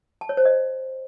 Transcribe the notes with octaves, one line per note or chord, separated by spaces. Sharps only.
A5
C#5
C5
D#5